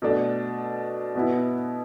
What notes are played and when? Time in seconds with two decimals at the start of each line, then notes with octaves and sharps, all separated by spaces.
0.02 B2 A3 D4
1.15 B2 B3 E4